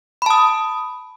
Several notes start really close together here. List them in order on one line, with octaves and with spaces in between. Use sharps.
B5 A5 D#6